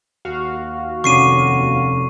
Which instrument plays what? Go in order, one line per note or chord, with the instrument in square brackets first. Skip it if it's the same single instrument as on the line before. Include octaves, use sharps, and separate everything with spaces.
[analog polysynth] D#2 F#4 F5
[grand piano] F1 C#4 D6 [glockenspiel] C#6 C7 D#7